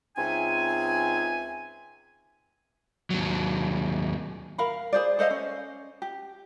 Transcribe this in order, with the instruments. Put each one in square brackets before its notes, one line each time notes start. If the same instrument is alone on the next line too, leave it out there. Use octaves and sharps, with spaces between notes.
[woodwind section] C#2 C4 D#4 E5 G#5
[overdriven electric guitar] D#2 F#3
[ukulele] A#4 F5 B5
G#4 C5 D5
A4 C5 D#5 F5
C#4
G4